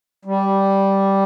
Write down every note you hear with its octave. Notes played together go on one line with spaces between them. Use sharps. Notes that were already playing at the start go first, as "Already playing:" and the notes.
G3